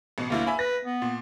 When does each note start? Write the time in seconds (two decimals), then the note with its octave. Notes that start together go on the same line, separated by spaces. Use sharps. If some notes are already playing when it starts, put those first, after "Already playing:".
0.18 A1 B2
0.30 G1 D2 A#3 E4
0.47 E5 G#5 B5
0.59 B4 A#6
0.85 B3
1.02 A#2